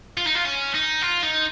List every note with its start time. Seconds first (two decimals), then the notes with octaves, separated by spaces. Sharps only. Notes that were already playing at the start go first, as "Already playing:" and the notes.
0.18 F4
0.27 D#4
0.35 F4
0.45 C#4
0.74 D#4
1.02 F4
1.23 D#4